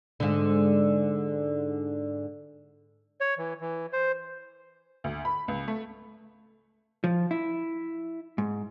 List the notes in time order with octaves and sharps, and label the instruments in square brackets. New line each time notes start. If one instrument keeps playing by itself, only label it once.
[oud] G#2 D3
[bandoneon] C#5
E3
E3
C5
[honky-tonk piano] D2
B5
C#2
A3
[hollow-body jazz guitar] F3
E4
G#2